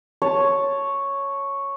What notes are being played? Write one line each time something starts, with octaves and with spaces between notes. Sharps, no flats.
C#5 A5